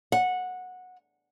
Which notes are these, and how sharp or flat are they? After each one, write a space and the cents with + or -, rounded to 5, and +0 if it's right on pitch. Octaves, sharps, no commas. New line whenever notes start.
F#5 -15